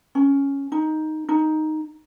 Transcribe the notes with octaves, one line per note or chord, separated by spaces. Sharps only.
C#4
D#4
D#4